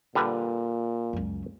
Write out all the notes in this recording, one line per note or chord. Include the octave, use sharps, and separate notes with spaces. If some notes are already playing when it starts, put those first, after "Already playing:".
A#2 D3 G3 B4
C#2 F#2